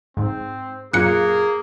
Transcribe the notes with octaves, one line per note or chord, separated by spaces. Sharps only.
G#2 C4
F#2 A#2 A#3 F4 G#4 F#6 C#7